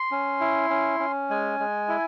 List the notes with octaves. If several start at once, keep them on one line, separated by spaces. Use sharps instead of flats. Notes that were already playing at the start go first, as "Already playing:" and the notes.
Already playing: C6
C#4
E4
C#4
C#4
G#3 G#5
G#3
E4